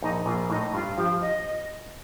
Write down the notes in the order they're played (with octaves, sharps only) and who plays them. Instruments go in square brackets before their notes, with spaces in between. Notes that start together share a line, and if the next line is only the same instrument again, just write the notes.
[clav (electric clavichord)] A#1 [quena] D#4
[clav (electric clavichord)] A#1 [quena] F4
[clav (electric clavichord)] A2 [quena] D#4
[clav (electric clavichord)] G2 [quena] F4
[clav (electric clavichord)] F3 [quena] G4
[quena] D#5